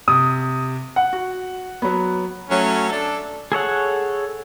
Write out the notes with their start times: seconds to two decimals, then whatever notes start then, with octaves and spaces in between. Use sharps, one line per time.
0.08 C3 D#6
0.96 F#5
1.13 F#4
1.82 F#3 B3
2.49 F#3 A3 C#4
2.89 D4 A4
3.52 G#4 A4 C#5 F#5